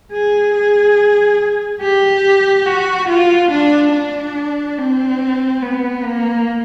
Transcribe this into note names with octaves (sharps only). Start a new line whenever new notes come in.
G#4
G#4
G4
F#4
F4
D4
D4
C4
B3
A#3